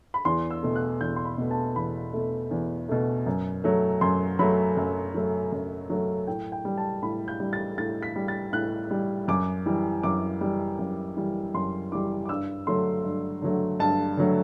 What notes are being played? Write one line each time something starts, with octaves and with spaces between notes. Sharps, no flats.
B5
E2 C6
E6
B2 A3
F#6
E2 G6
C6
B5
B2 A3
A5
E2 B5
B2 A3
E2
B2 A3
F#2
F#3 A3
F#2 C6
F#3 A3 B5
F#2
F#3 A3
F#2
F#3 A3
A2 G5
G5
G3
A5
A2 B5
G6
G3
A6
A2 A6
B6
G3
A6
A2 F#6
G3
F#2 D6
E3 G3
F#2 D6
E3 G3
F#2
E3 G3
F#2 C6
E3 G3 D6
D6
G2 E6
D3 F#3 A3 C6
G2
D3 F#3 A3
G2 A5
D3 F#3 A3